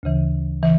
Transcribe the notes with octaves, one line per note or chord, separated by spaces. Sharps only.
D2 C#3 E3
C#3 E3